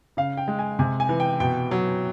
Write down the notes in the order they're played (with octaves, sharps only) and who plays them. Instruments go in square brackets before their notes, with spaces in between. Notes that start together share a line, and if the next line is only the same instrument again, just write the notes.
[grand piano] C#3 F5
G5
G#3
G#5
C3 G#5
G#5
E3
G5
B2 G5
F#3